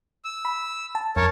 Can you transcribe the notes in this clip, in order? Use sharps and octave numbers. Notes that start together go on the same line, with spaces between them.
E6
B5
A5
F2 A#4 C#5 A5